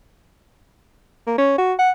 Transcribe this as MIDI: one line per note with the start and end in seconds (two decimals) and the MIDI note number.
1.27 1.38 58
1.38 1.58 61
1.58 1.73 66
1.79 1.91 78